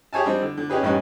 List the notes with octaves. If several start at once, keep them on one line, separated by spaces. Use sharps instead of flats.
G4 G#4 C#5 G#5 A5
G3 C4 D4 D#4
D3
D3
C#4 D#4 G4 G#4 B4
A1 G2 G3 C#4 D#4 B4